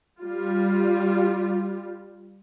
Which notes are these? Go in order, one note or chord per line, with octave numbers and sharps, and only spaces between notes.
G3 F4